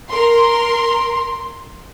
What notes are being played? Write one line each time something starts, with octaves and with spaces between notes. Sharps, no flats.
A#4 C6